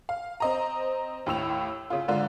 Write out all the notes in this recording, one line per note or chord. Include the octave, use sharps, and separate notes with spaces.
F5
C4 D#5 A#5
D#2 A2 E6 F7
C#3 F4
G#2 D3 F4